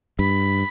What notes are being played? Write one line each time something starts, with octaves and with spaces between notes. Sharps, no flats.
G2 B5